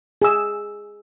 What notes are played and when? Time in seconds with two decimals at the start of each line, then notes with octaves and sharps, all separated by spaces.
0.22 G#4 E6